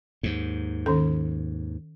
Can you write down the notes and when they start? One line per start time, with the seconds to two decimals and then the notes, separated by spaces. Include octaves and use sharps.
0.23 D#2 G#2
0.86 D#3 C#4 A4